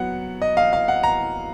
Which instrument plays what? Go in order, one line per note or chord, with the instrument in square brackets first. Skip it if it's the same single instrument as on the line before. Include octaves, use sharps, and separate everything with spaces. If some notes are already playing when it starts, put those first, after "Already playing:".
Already playing: [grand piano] F#3 B3 F#5
D#5
F5
F5
F#5
A#5